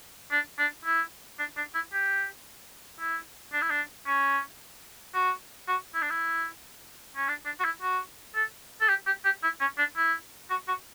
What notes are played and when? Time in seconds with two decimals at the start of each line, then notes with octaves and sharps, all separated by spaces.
0.31 D4
0.59 D4
0.85 E4
1.39 D4
1.57 D4
1.75 E4
1.93 G4
3.00 E4
3.53 D4
3.62 E4
3.70 D4
4.07 C#4
5.14 F#4
5.68 F#4
5.94 E4
6.02 D4
6.10 E4
7.16 C#4
7.28 D4
7.45 D4
7.60 F#4
7.64 E4
7.82 F#4
8.35 A4
8.81 A4
8.89 G4
9.06 G4
9.25 G4
9.43 E4
9.60 C#4
9.78 D4
9.97 E4
10.50 F#4
10.68 F#4